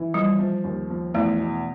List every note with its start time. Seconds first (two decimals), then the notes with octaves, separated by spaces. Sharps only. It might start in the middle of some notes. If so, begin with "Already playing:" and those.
Already playing: E3
0.14 F3 G3
0.39 F3
0.64 D#2
0.90 F3
1.14 E2 A3
1.39 B2